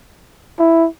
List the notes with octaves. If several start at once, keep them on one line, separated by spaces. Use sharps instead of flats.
E4